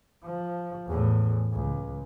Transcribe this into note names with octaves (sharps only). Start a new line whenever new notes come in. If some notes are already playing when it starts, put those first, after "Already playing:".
F3
E2 A2
C#2